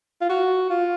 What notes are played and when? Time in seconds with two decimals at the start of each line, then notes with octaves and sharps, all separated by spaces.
0.21 F4
0.29 F#4
0.70 F4